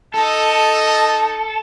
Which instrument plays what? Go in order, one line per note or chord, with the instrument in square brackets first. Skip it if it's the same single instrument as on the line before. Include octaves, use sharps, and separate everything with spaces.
[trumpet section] D#4 A5 [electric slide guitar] A4 [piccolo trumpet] D#5